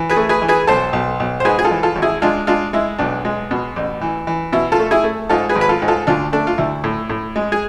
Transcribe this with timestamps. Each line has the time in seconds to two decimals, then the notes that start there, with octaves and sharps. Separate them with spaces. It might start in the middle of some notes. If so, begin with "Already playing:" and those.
Already playing: E3
0.10 G#4 B4
0.16 A3
0.29 G#4 B4
0.42 E3
0.48 G#4 B4
0.67 B1 A4 C5
0.93 B1
1.20 B1
1.40 C5
1.45 G#2 G#4 B4
1.59 G#4
1.65 F4 A4
1.71 E3
1.83 F4 A4
1.96 G#1
2.02 E4 G#4
2.22 G#3 D4 F4
2.47 G#3 D4 F4
2.73 G#3 E4
2.98 B1 D4
3.25 G#3
3.51 B2
3.76 A1
4.01 E3
4.27 E3
4.53 B2 E4
4.72 F4 A4
4.79 A3
4.91 E4 G#4
5.04 A3
5.29 G#2 F4 A4
5.49 G#4 B4
5.56 G#1
5.61 B4
5.69 F4 A4
5.82 G#2
5.88 F4 A4
6.07 D2 D4 F4
6.33 A3 D4
6.47 F4
6.58 D2 E4
6.84 A2
7.09 A2
7.36 G#3
7.52 G#4